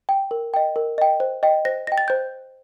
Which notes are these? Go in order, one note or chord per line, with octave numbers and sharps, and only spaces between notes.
G5
A#4
D#5 G5
A#4
D#5 G5
C5
D#5 G5
C5 A#6
D#5 G5 A#6
A6
C5 G6